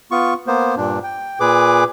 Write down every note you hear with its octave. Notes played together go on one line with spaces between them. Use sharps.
B3 F4 C#6
A#3 B3 C5
G2 A#2 D4
G5
A#2 G#4 B4 D6